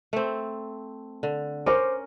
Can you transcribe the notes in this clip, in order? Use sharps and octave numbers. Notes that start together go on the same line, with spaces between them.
A3 C4
D3
C#4 A#4 C5 D6